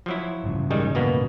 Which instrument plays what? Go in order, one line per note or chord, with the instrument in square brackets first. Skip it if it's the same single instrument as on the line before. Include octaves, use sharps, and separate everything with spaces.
[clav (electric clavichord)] F3 F#3 E4
[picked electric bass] A1 G2 C#3
[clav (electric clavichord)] D#3 G3 G#3
B2 A#3 B3